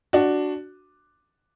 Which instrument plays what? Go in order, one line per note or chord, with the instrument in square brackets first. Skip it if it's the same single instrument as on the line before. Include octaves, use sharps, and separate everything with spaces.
[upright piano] D4 F#4